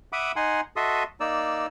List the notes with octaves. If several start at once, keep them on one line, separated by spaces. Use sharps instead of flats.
E5 F#5 B5 D6 D#6
D#4 F#5 G#5 C6
F#4 A4 D#5 E5 C6 D#6
A#3 D#4 D5 E6